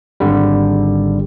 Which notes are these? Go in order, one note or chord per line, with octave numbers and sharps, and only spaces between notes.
G#1 D3 G3